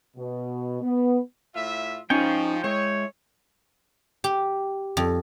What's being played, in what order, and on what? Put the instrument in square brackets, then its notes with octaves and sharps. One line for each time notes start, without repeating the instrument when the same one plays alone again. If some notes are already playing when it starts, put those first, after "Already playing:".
[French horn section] B2
B3
[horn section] A2 F4 E5
[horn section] F3 [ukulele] C#4 [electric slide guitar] D#4 G#4 [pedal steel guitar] G5 C#6
[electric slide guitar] G#3 [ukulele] E4 [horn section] C#5
[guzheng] G4
F2